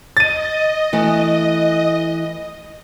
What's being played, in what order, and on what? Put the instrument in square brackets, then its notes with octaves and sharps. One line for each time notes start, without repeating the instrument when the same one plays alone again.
[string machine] D#5 [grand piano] A6 D#7
[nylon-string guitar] E3 A3